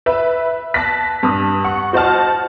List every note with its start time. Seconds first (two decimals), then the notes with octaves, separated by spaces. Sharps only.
0.06 B4 E5
0.74 A5 F#6 A#6 B6
1.23 G2 D#6
1.64 F#5 C#6
1.93 F#4 C5 D#5 F#5 A5 F6